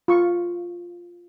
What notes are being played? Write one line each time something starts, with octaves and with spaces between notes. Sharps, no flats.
F4 C#6